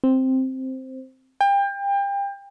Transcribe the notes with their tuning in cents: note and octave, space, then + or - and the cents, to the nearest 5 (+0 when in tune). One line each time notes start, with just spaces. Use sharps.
C4 +0
G5 +30